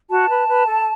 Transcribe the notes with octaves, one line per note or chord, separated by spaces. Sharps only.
F#4 A5
B4
B4
A4